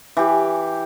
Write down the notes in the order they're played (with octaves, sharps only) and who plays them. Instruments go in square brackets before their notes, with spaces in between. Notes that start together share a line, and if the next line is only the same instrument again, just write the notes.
[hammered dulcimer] E3 G4